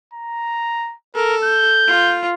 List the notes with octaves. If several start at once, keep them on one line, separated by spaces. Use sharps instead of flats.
A#5
A4 A#4
G6
F4